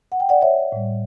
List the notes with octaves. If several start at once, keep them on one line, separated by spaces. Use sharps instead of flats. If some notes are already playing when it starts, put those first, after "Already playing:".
F#5
G5
D5 F#5
C#5 E5
A2 G3